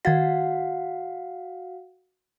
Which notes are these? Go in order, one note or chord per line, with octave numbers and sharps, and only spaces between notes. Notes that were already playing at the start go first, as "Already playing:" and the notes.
D#3 F#4 F5 F#5 G#6 A6